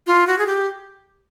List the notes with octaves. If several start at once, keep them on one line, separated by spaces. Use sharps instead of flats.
F4
F#4
G#4
G4